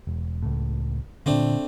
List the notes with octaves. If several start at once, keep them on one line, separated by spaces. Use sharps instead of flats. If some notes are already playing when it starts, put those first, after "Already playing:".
E1
C#2 A2
A#2 D3 A3 C4 D4